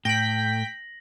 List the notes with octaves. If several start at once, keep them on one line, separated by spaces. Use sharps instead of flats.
A2 G5 A#6 B6 F#7